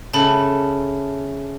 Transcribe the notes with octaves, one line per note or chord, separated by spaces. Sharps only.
C#3 A3 A4 A5 B5